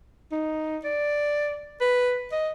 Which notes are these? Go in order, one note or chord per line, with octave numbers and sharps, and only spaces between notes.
D#4
D5
B4
D#5